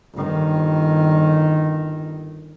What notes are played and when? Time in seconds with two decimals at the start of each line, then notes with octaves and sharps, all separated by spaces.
0.14 G1 D#3